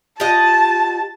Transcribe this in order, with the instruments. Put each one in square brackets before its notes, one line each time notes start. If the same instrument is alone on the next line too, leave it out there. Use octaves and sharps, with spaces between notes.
[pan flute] F4 [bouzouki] G4 D#5 F#5 [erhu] A5